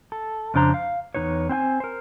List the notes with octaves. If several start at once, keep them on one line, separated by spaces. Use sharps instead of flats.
A4
F2 C#3 D4 C5 A#5
F5
E2 D#3 D#4 B4 C#5
C4 C5 G5 G#5
A#4 C5